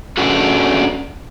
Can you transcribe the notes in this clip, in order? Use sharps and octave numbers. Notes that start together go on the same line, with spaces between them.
C#4 D4 F#4 G#4 A4 B4